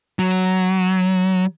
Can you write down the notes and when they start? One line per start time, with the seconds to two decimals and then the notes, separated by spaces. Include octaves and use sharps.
0.19 F#3